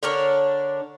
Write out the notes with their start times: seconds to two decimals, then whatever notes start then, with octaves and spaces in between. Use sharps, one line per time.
0.03 D3 D4 A#4 C#5